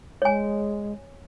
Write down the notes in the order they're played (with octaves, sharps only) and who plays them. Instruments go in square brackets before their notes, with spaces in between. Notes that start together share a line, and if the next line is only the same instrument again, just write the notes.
[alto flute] G#3 [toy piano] C#5 G#5